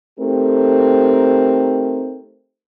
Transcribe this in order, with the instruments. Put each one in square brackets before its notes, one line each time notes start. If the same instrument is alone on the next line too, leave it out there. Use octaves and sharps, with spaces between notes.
[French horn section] A3 C4 D#4 G4 A4 A#4